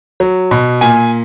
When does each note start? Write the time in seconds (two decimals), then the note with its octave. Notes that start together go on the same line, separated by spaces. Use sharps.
0.20 F#3
0.51 B2
0.81 A#2 G#5